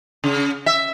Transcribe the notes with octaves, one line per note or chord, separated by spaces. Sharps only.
C#3
E5